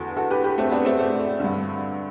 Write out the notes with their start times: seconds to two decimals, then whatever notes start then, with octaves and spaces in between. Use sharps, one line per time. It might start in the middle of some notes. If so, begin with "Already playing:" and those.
Already playing: E2 D3 F#4 A4
0.17 F#4 A4
0.31 G4 B4
0.44 G4 B4
0.58 A3 C4
0.72 B3 D4
0.85 A3 C4
0.99 A3 C4
1.40 G2 D3